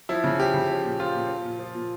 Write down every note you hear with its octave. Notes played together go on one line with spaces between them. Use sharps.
F3 E4
C#3
F3 G4
C#3
F3
A#2
F3 F4
A#2
F3
A#2
F3
A#2